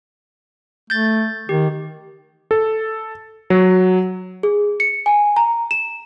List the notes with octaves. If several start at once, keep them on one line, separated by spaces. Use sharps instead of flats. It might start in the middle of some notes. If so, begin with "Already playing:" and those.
A3 G6 A6
D#3 G4
A4
F#3
G#4
C#7
G#5
A#5
E7